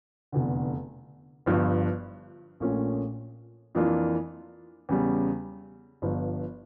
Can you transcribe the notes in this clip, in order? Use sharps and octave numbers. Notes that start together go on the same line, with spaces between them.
F1 E2 D3
G1 G2 F3
A#1 A#2 A3 C#4
F2 E3 A#3 D4 F4
E2 C#3 G3
G1 G2 F3